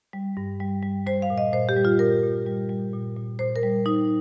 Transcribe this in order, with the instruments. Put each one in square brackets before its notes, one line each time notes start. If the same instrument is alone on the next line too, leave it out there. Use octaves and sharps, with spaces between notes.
[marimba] G3
G2
G3
G3
G3 C5
F5
A#2
D#5
A#2 C5
G4
G3
F4
A#2 A#4
A#2
G3
G3
A#2
A#2
A#2 C5
A#4
G3
G3 D#4